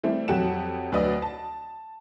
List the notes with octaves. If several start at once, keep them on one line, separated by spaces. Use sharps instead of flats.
E3 G3 A3 C4 E4
F2 F#3 G4 A4 F#5 E7
D2 F#3 B4 D5 D#5 D#6
A5